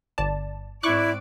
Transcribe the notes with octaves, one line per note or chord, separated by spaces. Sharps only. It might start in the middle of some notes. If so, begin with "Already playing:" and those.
G1 D5 A5
G#2 C4 E4 D5 C#6 D6 F#6